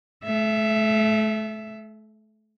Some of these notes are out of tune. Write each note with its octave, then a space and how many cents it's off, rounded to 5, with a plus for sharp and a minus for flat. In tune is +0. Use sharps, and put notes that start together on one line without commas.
A3 -35 E5 +10